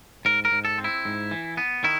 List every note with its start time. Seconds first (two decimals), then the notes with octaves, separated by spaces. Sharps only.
0.25 G#2 A#4
0.45 A#4
0.52 G#2
0.65 A4
0.78 C4
0.84 E4
1.05 G#2
1.31 E3
1.57 B3
1.84 D#3 E4